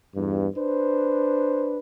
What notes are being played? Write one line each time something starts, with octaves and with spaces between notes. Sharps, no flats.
E2 G2
D4 B4 C5